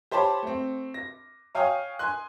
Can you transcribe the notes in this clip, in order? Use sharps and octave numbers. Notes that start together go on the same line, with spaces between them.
G4 C5 C#5 A5 B5 D6
A3 C4
A#6
C#5 F5 G5 G#5 C#6 D#6
G#5 C6 F#6